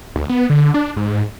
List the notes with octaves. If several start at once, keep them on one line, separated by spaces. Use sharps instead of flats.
D2
B3
D3
D4
G#2